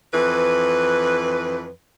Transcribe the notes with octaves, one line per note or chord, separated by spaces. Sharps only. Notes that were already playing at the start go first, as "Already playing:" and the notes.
F2 E3 B4